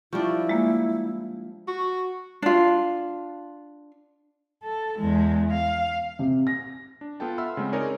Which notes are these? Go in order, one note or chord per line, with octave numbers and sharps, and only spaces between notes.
F3 G3 D4 E4 C#6
G#3 A#3
F#4
D4 F4
A4
E2 G#3
F5
C3
A#6
D4
B3 F4 A4 G5 A5
E5 F#5 B5 C6 E6 F6
C#3 G#3 A3 C4
C#4 D#4 G#4 A#4 C#5 D5